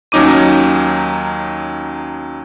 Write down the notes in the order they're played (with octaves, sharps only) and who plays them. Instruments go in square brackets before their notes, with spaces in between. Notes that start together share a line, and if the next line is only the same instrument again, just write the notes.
[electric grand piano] D#2 F#3 C#4 D#4 D6 D#7